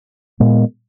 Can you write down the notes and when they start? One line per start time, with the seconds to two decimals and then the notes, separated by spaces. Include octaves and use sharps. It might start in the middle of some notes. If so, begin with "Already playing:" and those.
0.40 A#2 G#3 B3